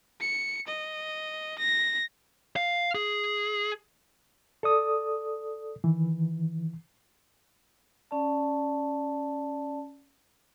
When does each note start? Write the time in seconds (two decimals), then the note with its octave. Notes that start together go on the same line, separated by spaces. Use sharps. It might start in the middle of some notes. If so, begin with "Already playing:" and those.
0.21 C#7
0.67 D#5
1.59 A#6
2.56 F5
2.95 G#4
4.63 A4 D5 D#6
5.84 D#3 E3
8.11 C#4 D5 A5